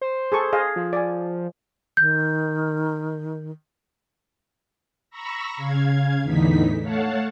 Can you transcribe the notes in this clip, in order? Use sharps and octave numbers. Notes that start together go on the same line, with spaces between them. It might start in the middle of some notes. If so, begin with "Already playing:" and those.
C5
G#4 A4 C#6
G#4 D#5 F5
F3
D5 G#5
D#3 G6
A#5 B5 C#6 E6 A#6
C#3 F5 G#6
E2 A2 D3 E3 D#4 B6
A3 C#5 F5 F#5 A5